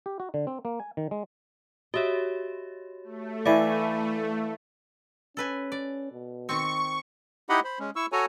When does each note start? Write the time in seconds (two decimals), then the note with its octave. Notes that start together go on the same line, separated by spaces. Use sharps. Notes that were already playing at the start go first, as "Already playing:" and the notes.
0.06 G4
0.20 F#4
0.34 D3
0.47 C4
0.65 A#3
0.80 G#5
0.97 D#3
1.11 G#3
1.94 F#4 G4 C#5 D#5 E5
3.04 A3
3.46 E3 E4 D5 F5 D#7
5.37 C#4 A4 B4 G#5
5.72 D5
6.12 B2
6.49 D#3 C4 C#6
7.49 D#4 E4 G4 D#5 F#5 B5
7.64 C5 B5
7.79 G#3 C#4
7.96 E4 C#6 E6
8.12 F#4 A4 C#5 G#5 A#5